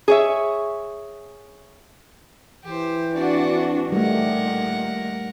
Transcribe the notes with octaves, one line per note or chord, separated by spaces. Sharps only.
G#4 C#5 E5
E3 G4 C5
C4 D4 F#4 D5 F#5
A#2 D#3 G3 A3 A#4 F#5